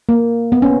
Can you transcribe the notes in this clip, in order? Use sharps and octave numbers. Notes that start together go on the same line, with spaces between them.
A#3
B3
C#4